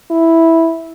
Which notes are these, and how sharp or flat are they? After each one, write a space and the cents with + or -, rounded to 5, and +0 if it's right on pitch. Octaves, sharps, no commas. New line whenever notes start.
E4 -5